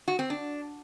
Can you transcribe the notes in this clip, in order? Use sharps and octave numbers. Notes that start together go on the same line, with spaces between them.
F#4
C4
D4